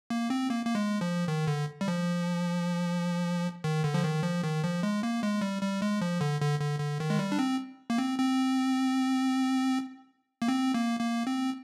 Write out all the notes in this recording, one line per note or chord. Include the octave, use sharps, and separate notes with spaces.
A#3
C4
A#3
A#3
G#3
F3
D#3
D3
G3
F3
D#3
D3
F3
D#3
F3
D#3
F3
G#3
A#3
G#3
G3
G3
G#3
F3
D3
D3
D3
D3
D#3
G#3
G3
D4
C4
A#3
C4
C4
A#3
C4
A#3
A#3
C4